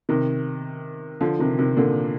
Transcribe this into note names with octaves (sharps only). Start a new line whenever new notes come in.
C3 D#3
D3 F3
C3 D#3
C3 D#3
A#2 D3